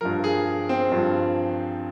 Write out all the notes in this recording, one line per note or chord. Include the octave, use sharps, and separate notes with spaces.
G2 F3 A#4
G#4
C4
G2 F3